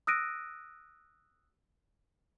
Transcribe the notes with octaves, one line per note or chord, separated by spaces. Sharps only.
D#6 E6 F#6 A#6 D7 D#7